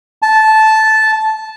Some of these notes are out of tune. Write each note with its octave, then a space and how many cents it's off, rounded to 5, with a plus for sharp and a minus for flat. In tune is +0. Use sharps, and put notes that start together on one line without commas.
A5 -10